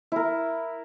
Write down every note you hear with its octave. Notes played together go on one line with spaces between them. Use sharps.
E4 A#4